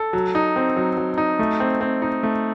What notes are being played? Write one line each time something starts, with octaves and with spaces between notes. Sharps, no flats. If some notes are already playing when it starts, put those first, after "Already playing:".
Already playing: A4
F#3
D#4
C4
F#3
F#3
D#4
A3
C4
C4
D#4
A3